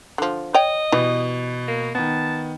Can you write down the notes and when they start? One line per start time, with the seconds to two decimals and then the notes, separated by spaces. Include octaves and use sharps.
0.18 D3 F3
0.54 C#5 D#5 G5
0.92 B2 E3 G3
1.68 A#3
1.95 D#3 B3 A5